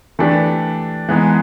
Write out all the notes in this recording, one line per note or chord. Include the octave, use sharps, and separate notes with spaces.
E3 A3 D4 G4
E3 G#3 B3 D#4 G#4